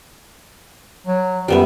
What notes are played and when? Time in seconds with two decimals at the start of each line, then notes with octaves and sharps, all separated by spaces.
1.06 F#3
1.48 F#2 G3 B3 E5